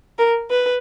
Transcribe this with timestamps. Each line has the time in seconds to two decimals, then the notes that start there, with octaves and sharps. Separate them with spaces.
0.19 A#4
0.50 B4